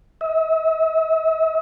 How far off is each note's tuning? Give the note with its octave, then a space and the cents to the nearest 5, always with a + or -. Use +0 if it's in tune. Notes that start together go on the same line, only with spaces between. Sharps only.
E5 -45